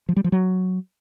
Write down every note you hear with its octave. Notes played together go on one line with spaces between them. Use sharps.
F3
G3
F3
F#3